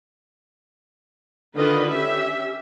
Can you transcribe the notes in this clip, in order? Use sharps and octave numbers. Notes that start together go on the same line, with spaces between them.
D3 D#3 D4 F4 B4 D#5
C#4 G4 E5